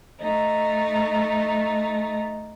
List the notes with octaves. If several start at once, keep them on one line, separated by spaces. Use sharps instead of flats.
A3 D#4